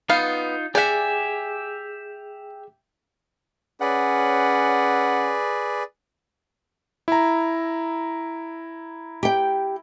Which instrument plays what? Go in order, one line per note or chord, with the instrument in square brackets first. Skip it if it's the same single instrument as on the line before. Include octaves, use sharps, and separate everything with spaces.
[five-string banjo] B3 F5 [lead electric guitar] D#4 F4
[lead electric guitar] G4 E5 [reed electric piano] G#4 [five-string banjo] D5 F#5 [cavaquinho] G#5
[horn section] C#4 F#5 [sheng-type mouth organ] G#4 B4 D5
[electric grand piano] E4 A#5
[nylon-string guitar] G4 G5